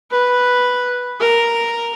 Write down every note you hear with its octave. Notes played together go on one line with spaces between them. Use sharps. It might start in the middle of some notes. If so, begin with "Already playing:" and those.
B4
A#4